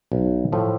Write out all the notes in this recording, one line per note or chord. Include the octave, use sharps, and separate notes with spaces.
B1
A2 F3 A3